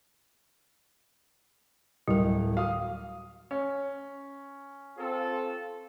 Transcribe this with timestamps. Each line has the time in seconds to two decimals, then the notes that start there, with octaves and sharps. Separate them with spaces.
2.08 D1 G3 A#4
2.57 F#4 F5 D#6
3.51 C#4
4.98 C4 F4 A4